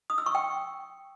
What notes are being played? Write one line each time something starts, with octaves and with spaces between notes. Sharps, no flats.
D#6
E6
C#6
G5